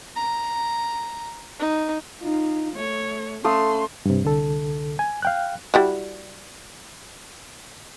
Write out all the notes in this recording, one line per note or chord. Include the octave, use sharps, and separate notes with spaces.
A#5
D#4
D#4 F4
A3 C#5
A3 C#4 F5 C6 D#6
G2 C3
C2 D3 A4
G#5
F5 G5 F#6
G3 E4 F#4